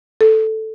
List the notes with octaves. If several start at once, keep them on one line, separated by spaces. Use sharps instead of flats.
A4